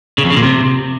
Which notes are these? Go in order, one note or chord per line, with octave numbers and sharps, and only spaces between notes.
C#3
F2
C#3
A#2
C3